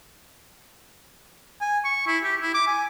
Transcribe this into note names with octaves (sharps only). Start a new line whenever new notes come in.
G#5
C#6
E4
G4
E4
D6
G#5